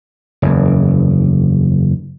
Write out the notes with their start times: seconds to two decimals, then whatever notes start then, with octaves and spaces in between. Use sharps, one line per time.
0.42 F#1 E2